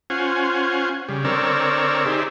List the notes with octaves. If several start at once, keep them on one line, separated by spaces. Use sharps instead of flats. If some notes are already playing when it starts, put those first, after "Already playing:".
C#4 F4 C5 F#5 G#5
C#3 G3
D3 C4 A#4 C#5 D5 E6
D#4 G4 G#4 C5 D5 E5